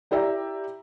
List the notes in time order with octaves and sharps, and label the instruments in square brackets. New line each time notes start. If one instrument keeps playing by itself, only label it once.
[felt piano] E4 G4 D5 E5 G5 A#5